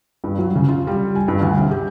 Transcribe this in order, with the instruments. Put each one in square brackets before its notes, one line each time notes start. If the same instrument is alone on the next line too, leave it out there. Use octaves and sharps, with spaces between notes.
[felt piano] G2
F#3
C#3
F4
G3
G#5
G2
D2
C3
G4